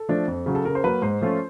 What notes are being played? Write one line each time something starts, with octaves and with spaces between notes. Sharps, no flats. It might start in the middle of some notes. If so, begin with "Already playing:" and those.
Already playing: A4
F3 A3 D4
F2
C#3 F#3
A4
C#3 A#4
C5
F#3 A#3 B4
G#2 C5
F3 A3 C#4 F4